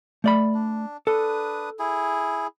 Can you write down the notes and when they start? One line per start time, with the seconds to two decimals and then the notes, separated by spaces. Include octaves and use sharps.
0.24 A3 D5 B5
0.54 D4
1.07 D4 A4 B4 D#6
1.79 E4 G#4